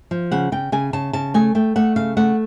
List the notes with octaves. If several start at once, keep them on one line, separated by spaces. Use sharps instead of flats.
F3
C#3 F#5
C#3 G5
C#3 G#5
C#3 A5
C#3 A5
A3 G#5
A3 G5
A3 F#5
C#3 F5
A3 F#5